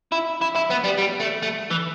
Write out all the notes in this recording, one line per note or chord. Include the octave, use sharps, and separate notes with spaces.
E4
E4
E4
B3
G3
G3
A3
A3
E3